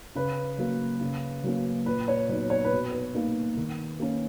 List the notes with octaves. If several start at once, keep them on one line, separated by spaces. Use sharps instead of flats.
C#3 B4
F#3 A#3
C#3
F#3 A#3 C#4
A#2 B4
C#5
F#3 B3 D#4 C#5
C#5
B4
B2
B4
A#3 D#4
D#3
A#3 C#4